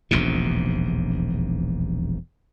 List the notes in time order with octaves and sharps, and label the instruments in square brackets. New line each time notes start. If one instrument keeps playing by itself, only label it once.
[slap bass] E1 A#1 D#2 C3